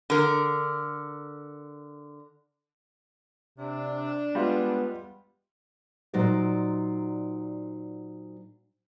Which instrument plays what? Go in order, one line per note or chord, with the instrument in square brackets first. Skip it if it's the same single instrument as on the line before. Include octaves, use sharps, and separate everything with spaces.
[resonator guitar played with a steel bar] D3 A#4
[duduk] C3 [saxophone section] D4
[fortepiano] G3 F4 [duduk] G#3 [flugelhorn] B3
[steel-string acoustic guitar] A#2 F#3 D#4 C5 D5